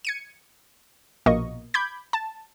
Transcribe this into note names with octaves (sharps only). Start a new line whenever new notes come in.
G#6 C#7 D#7
A#1 B2 A#3 D#5 C#6
B5 D6 G6 G#6
A5